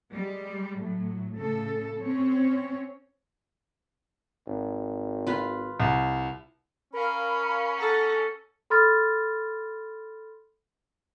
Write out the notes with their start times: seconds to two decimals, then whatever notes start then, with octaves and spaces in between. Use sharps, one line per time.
0.14 G3 G#3
0.79 A2 F#3
1.37 A2 C#3 A4
2.00 C4 C#4 C#5
4.47 G#1
5.27 F4 B4
5.80 C2
6.93 C#4 A#4 F5 B5
7.78 A4 F#5 A#5 A#6
8.70 A4 B5 C6 F6 A6